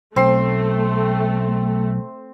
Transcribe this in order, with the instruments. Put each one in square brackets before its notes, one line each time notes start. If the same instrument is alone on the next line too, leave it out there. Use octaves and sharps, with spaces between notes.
[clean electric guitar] B1 [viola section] A3 [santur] C4 C6